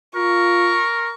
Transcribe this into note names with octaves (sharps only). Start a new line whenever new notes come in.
F4 A#4 C#6